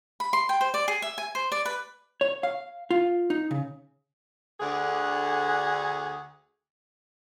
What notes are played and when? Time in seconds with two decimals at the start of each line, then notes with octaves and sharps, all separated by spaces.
0.20 B5
0.33 C6
0.49 G5
0.61 C5
0.74 D5
0.88 G#4
1.02 E5
1.18 G#5
1.35 C5
1.52 D5
1.65 B4
2.21 C#5
2.43 F5
2.91 F4
3.30 D#4
3.51 C#3
4.60 D2 D3 G#4 F#5